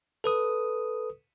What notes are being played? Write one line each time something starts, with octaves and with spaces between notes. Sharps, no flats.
A4 B4 D#6